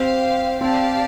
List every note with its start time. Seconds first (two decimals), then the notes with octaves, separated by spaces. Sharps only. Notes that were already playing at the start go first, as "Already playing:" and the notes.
Already playing: C4 G4 C5 F5
0.61 C4 G4 D5 F5 A5